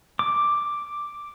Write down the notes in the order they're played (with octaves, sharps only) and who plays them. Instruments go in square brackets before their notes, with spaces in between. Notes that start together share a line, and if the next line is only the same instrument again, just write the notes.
[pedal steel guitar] D6